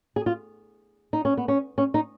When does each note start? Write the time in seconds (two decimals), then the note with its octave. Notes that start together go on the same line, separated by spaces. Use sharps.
0.16 G#4
0.26 F4
1.13 D#4
1.25 C#4
1.37 B3
1.48 C#4
1.78 C#4
1.94 D#4